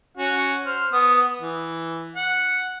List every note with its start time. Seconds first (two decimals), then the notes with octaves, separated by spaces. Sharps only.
0.17 C#4 F#4 F#5
0.66 C5 F6
0.93 B3 D#6
1.41 E3
2.16 F#5